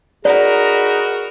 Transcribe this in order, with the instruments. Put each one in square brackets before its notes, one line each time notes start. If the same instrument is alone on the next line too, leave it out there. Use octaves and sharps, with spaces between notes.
[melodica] D#4 B4 [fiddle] F#4 A#4 [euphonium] G#4 [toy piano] D5